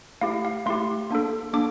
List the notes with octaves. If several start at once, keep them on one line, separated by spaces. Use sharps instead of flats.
A3 E4 G4 F5
F5
A3 E4 G4 C6
A#3 D4 A4
A#3 D4 A4 D6